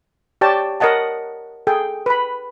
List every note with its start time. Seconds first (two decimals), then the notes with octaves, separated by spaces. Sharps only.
0.41 G4 C#5 D5 G5 A5
0.80 A#4 C#5 D#5 F#5 A5
1.67 G#4 A4 G5
2.06 B4 B5